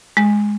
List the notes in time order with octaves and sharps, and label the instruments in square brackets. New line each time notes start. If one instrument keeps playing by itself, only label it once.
[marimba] G#3